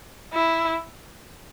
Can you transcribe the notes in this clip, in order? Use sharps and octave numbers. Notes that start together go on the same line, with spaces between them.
E4